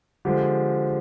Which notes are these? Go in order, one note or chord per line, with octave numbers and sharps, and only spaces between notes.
D3 F3 G#3 G4